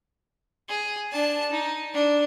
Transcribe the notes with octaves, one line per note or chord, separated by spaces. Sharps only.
G#4
D4 A5
D#4
D4